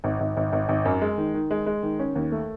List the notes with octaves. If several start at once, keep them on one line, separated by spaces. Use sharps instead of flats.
G#1
G#1
G#1
G#1
G#1
F#2
G#3
D#3
D#3
G#3
G#3
D#3
C#4
D#2
A3